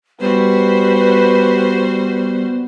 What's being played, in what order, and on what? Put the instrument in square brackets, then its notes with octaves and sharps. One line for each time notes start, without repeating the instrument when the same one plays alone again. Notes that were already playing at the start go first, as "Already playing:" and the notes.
[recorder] G3 [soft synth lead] B3 [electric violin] F#4 C5 [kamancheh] B4